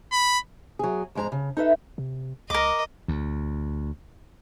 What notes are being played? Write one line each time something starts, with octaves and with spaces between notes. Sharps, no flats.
B5
F#3 G#4
F2 G#2 G#3 A4 A#5
C#3
D#4 A4 B4 E5
C3
C#2 A#4 D#5 D6
D2